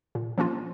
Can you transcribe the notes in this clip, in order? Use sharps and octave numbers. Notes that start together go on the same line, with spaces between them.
A#2
F3 A#3 C#4 F4